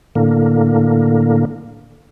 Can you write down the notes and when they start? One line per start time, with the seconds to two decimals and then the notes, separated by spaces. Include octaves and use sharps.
0.15 A2 D3 A#3